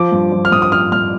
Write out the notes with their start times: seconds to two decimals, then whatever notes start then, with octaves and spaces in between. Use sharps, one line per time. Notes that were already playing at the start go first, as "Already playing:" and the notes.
Already playing: F3 D6
0.12 G2
0.32 F3
0.45 F6
0.52 G2 D#6
0.62 D#6
0.72 F3 F6
0.92 G2 F6